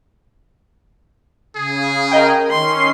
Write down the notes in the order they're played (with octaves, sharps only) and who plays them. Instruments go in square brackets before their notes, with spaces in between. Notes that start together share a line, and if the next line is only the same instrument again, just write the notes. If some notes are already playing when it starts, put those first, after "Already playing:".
[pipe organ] C#3 [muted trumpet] G#4
[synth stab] A#4 D#5 G5
[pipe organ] D#3 C#4 [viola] C6